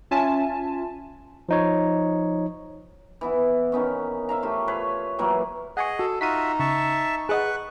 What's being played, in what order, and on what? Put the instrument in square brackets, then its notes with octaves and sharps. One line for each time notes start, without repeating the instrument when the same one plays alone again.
[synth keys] C#4 F4 E5 G#5 A5
[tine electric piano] F3 D#4 C#5
[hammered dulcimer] E3 B3 E4
D#3 B3 C#4
E5 F5 A#5
A3 F4 G4
B4 C#5 C6
A#2 E3 F#3 A#3
[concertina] G#4 D#5 [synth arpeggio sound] F#5 G#5 C#6
[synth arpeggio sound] F#4 [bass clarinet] A4
[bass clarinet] D#4 [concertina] F4 F#4 E5 [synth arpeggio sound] B6 C7 D#7
[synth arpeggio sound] C#3 [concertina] E5 A5 C#6
[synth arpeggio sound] G#4 D#5 F#5 [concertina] B4 C#6 F#6